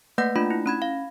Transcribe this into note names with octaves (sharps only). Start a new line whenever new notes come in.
A3 A#3 B4 F#5 G6 A#6
A3 D4 F4 B5
E4
C#4 B5 G#6
F5